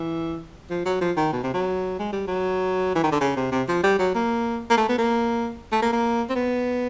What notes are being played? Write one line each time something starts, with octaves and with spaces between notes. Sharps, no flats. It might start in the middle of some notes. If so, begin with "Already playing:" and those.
Already playing: E3
F3
F#3
F3
D#3
B2
C3
F#3
G#3
G3
F#3
E3
D#3
D3
C#3
C3
C3
F3
G3
F#3
A#3
A#3
A3
B3
A#3
A3
A#3
A#3
C4
B3